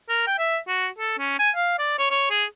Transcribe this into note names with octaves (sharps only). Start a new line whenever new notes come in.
A#4
G5
E5
F#4
A4
C#4
G#5
F5
D5
C#5
C#5
G#4